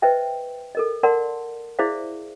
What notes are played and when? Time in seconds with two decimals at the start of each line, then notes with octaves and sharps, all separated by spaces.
0.02 B4 C5 D#5 E5 G5
0.75 A4 A#4 D#5
1.03 A#4 D5 F#5 A5 C6
1.79 E4 G#4 C5 D5 E5 F5